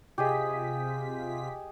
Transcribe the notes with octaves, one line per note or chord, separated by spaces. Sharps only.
C3 F4 G4 G#4 D#5 B6